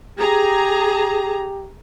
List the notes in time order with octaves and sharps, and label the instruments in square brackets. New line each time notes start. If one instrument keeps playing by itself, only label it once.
[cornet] G4 [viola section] G#4 A#5